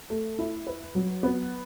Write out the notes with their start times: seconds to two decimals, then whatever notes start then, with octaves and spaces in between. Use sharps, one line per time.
0.10 A3
0.39 E4
0.67 B4
0.95 F#3
1.23 B3